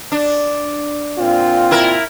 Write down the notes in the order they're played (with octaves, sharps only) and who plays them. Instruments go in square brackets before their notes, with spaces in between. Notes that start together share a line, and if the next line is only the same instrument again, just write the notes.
[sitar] D4
[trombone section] A#2 C4 F4
[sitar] E4 A#4